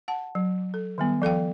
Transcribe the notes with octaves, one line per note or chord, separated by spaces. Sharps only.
F#5 A5
F#3
A4
D#3 G3 B3
F3 A4 F5 G5